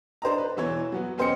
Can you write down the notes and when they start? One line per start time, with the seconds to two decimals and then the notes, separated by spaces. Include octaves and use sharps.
0.22 D4 C5 D#5 A#5
0.38 B4
0.57 E2 B2 E3 C#5
0.92 F#3 B3 F#4
1.18 E2 C#4 C5 D#5 G5 C#7